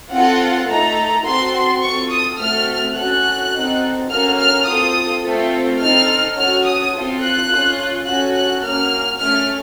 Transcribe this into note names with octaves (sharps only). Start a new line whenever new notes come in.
C4 F4 A4 F#5
A3 D#4 A4 A#5
C4 F#4 A4 C6
C4 F4 A4 C#6
D#6
A3 C4 F#4 A4 F6
C#4 F#4 A4 F#6
C4 D#4 F#4 A4
A#3 C#4 F#4 A4 F6
F6
C4 F4 A4 D#6
A3 C4 F4 A4
C4 D#4 A4 F6
C#4 F#4 A4 F6
D#6
C4 F4 A4
F#6
C#4 F4 A4
C#4 F#4 A4 F#6
F#6
A#3 C#4 F#4 F6
A3 C#4 A4 F6